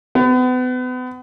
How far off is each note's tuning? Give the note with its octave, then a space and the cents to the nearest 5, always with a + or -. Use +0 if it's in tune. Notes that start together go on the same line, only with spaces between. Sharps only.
B3 +35